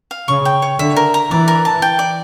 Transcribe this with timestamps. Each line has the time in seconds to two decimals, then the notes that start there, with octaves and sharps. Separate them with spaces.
0.11 F5
0.28 C#3 C#6
0.45 G5
0.62 C#5
0.79 D3 E5
0.96 A#4
1.14 A#5
1.31 E3 D5
1.48 A#4
1.65 A5
1.82 G5
1.99 D5